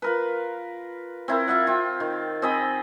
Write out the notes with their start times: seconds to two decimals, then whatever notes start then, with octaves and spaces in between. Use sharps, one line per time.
0.02 F4 A#4 B4
1.28 C4 E4 A#4
1.47 F4 E5 F#5
1.67 F4 G5
2.00 D#3
2.42 C4 G#4 D#5 B5